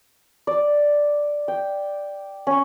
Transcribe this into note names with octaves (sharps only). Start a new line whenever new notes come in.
D5
G5
C#4